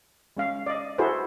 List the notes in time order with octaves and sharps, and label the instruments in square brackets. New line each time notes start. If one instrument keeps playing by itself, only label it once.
[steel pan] G#3 C#4 F5
D5 D#5
E4 F#4 G#4 A4 B4 C5